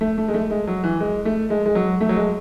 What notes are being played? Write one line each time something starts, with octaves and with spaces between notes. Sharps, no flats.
A3
A3
G#3
A3
G#3
F#3
E3
G#3
A3
G#3
G#3
F#3
A3
F#3
G#3